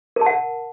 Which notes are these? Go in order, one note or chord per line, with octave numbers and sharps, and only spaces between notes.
A#4
A5
F#5